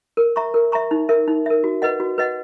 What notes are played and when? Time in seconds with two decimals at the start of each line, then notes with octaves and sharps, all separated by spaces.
0.17 A#4
0.36 E5 A#5 C#6
0.54 A#4
0.72 E5 A#5 C#6
0.91 D#4
1.09 A#4 E5
1.28 D#4
1.46 A#4 E5
1.64 F#4
1.82 B4 D#5 F#5
2.00 F#4
2.18 B4 D#5 F#5